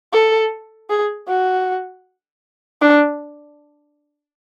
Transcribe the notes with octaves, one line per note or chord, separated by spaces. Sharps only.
A4
G#4
F#4
D4